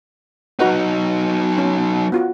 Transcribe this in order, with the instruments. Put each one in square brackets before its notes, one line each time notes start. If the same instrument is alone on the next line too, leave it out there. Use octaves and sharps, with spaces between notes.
[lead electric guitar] F#3 D#4 [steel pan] F#4 B4 F#5
[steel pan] C#4
B3 F4 F#4